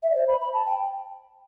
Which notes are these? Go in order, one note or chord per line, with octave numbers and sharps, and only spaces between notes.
E5
D5
C5
B5
B5
A5
G5